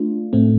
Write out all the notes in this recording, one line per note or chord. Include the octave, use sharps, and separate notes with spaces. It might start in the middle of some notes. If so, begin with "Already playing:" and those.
Already playing: A3 D4 F4
A2 A3 C4